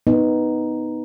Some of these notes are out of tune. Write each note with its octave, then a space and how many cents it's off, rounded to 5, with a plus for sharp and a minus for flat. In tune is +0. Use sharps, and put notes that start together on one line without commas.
B3 +0 D#4 +0